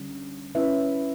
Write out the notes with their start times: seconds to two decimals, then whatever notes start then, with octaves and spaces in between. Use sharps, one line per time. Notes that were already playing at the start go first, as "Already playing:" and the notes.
Already playing: D3 G3 C#4
0.55 C#4 E4 B4 E5